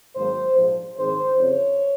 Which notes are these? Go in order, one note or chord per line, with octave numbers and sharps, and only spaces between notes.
G#1 G#2 D#3 F#3 A#3 C5
A#1 G#2 F3
A#1 G#2 D#3 G#3 C4 C5
F2 C#3 F3 C#5